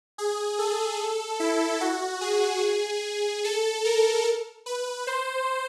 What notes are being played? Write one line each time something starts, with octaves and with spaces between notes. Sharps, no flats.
G#4
A4
E4
F#4
G#4
A4
A#4
B4
C5